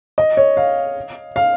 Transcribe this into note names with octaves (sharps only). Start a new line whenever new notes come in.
D#5
C#5
F5
F5